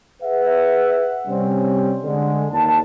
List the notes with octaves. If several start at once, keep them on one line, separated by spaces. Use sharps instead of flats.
G#4 B4 E5 F#5
C3 G3 C4 C#4
D3 G#3
D#2 A5